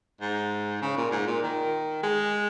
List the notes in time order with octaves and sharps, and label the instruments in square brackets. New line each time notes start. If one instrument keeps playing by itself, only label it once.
[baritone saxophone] G#2
C#3
A#2
G#2
A#2
D#3
G#3